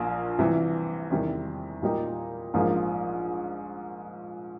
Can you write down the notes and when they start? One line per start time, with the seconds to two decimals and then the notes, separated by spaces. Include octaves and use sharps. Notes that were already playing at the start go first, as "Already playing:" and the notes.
Already playing: A#1 A#2 A#3
0.39 C3 E3 G3
1.10 E2 C3 D#3 G3
1.82 A#2 G3 A#3 D#4 G4
2.54 A#1 G#2 F3 A#3